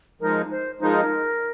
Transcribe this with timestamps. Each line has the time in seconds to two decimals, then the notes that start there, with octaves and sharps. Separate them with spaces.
0.21 F3 G#3 D#4 A#4
0.51 C5
0.80 F3 G#3 D#4 A#4 C5